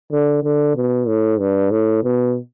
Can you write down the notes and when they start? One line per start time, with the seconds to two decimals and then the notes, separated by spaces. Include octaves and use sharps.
0.12 D3
0.43 D3
0.75 B2
1.08 A2
1.40 G2
1.72 A2
2.04 B2